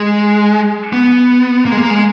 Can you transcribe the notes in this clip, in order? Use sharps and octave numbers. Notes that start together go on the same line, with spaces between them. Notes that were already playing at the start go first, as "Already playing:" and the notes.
Already playing: G#3
B3
A#3
G#3
A#3
G#3